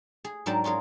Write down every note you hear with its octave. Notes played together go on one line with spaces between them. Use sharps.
G#4
G#2 F#3 D4 A#4 G5 A5
C#4 F4 G#4 A#4